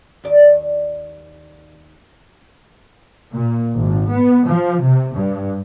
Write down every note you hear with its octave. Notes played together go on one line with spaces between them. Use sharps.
D#2 D5
A#2
G#1
B3
F3
C3
G2